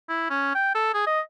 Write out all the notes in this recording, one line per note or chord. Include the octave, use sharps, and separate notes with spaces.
E4
C#4
G5
A4
G#4
D#5